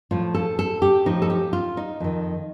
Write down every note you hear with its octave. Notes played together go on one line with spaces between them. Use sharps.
A2 F3 F4
A4
A4
G4
A2 F3 D#4
A4
G4
F4
D#4
F2 D#3